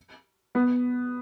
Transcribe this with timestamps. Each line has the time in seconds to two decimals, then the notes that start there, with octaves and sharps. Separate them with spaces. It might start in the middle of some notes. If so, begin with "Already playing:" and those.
0.55 B3